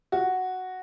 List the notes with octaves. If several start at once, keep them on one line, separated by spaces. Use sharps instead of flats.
F#4